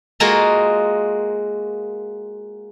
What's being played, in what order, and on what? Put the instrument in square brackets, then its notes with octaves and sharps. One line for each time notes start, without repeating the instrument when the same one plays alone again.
[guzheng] G#3 A#3 F4 F#4 G#4 A#4